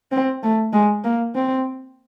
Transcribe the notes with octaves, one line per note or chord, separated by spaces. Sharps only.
C4
A3
G#3
A#3
C4